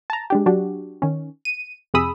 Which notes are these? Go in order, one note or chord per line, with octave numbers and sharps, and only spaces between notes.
A5 A#5
G#3 D4 G4
F#3 D4 F#4 G4
D#3 C#4
D#7
F2 C3 G#4 B5 D#6 E6